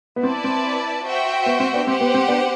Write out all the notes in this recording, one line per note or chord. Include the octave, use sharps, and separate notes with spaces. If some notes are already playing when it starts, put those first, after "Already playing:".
B3
C4 E4 B4 D5 A5
C4
F#4 C5 E5 G5
B3
C4
B3 D4
C4 G4 C5 F#5
B3
C4
B3 D4